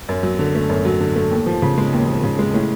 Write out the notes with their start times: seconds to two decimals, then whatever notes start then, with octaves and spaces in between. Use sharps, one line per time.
0.09 F#2
0.23 F#3
0.39 D3
0.55 A3
0.69 F#2
0.85 F#3
1.00 D3
1.16 A3
1.31 D#2
1.46 F3
1.62 C#3
1.78 G#3
1.93 D#2
2.08 F3
2.23 C#3
2.39 G#3
2.54 A2